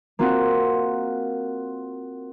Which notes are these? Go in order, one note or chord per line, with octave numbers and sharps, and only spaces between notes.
A#3 C4 F4 F#4